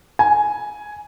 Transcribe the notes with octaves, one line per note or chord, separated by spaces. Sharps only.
G#5